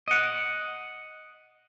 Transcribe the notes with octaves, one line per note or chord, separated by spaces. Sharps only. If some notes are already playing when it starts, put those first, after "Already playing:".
D#5 F#5